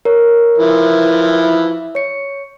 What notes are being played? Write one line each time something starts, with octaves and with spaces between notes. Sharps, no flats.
A#4 C#5
E3 F3 E5
C#5 C#7